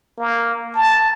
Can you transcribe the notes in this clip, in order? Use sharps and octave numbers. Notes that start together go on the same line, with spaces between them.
A#3
A5